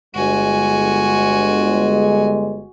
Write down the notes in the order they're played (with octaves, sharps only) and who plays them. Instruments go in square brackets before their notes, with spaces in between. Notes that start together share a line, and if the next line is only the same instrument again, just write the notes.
[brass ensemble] G1 G#3 [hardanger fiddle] F#4 G#5